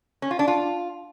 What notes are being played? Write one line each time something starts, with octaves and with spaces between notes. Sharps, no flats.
C#4
F4
D4
F4